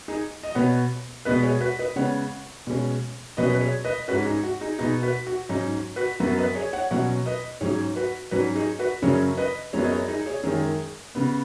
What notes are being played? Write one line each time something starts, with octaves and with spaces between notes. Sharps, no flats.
D#4 G#4
D#5
B2 B3 C#5 F#5
B2 G#3 B3 B4 D#5
G#4 C#5
F#4 B4
B4 D#5
C#3 G#3 B3 C#5 F#5
B2 G#3 C#4
B2 F#3 C#4 B4 D#5
B4
G#4 C#5
B4 D#5
G#2 G#3 C#4 F#4 B4
D#4 G#4
F#4
D#4 G#4
B2 B3 D#4 G#4
F#4 B4
F#4
G#2 F#3 C#4 D#4
F#4 B4
F#2 F#3 B3 F#4 B4
B4 D#5
G#4 C#5
C#5 F#5
B2 F#3 C#4 C#5 F#5
B4 D#5
G#2 F#3 C#4 G#4 C#5
F#4 B4
G#2 F#3 C#4 F#4 B4
D#4 G#4
F#4 B4
F#2 C#3 F#3 C#4 G#4 C#5
B4 D#5
F#2 F#3 B3 G#4 C#5
D#5
G#4 C#5
D#4 G#4
G#4 C#5
F#2 D#3 G#3 G#4 C#5
C#3 B3